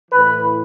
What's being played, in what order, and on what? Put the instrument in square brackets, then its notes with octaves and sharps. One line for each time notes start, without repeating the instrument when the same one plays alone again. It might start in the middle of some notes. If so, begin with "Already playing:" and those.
[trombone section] A2 E3 B4